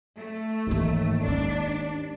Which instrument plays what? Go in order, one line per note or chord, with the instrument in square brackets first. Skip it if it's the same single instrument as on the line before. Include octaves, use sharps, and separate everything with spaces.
[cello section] A3
[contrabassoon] D#2 [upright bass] G#2 E3
[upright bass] G#3 C#4 [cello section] D4